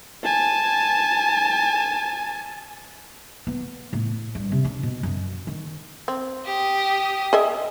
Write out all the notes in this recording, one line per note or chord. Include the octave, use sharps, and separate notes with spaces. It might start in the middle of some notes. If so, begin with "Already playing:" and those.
G#5 A5
B3
A2
G2
C3
D4
B2
F#2
D#3
C4
G4 D#6
G#4 D#5 E5